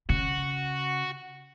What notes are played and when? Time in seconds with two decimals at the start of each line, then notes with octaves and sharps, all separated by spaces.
0.09 C#3 F#4